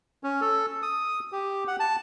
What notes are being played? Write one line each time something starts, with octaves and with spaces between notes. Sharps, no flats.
C#4
A4
D#6
G4
F#5
A5